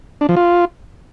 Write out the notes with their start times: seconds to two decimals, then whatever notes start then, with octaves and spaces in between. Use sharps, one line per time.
0.21 D4
0.29 F3
0.37 F4